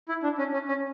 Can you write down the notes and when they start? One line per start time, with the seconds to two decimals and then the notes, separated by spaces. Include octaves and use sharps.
0.09 E4
0.23 D4
0.38 C#4
0.53 C#4
0.68 C#4